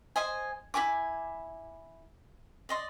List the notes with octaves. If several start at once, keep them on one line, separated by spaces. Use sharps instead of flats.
C5 D#5 G#5
E4 F#4 G#5 D6
D5 D#5 C6